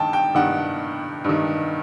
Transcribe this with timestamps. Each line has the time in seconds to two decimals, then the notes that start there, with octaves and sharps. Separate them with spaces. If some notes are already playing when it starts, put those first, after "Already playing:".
Already playing: G2 D#3 G5 A5
0.13 G5
0.35 G2 D#3 F#5
1.24 G2 D#3